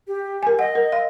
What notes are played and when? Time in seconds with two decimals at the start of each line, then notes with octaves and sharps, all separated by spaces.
0.07 G4
0.43 A#4 G#5
0.59 D#5 F#5
0.75 A#4
0.92 F5